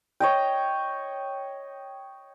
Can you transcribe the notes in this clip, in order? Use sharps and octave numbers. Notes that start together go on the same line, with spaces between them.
C#5 D#5 G5